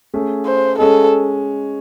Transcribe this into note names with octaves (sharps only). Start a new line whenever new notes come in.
A3 C#4 G#4
C5
G#3 C#4 G#4 A4 D#5